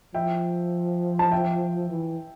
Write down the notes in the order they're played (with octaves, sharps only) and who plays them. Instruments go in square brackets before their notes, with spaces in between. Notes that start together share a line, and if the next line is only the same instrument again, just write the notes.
[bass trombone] F3 [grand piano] E5 G5
[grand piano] A5
E5 G5
[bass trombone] E3